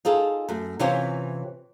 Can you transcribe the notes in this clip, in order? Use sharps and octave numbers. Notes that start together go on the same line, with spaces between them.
D#4 F4 G#4 A4
F#2 A3
C3 E3 C#4 F4 C5 C#5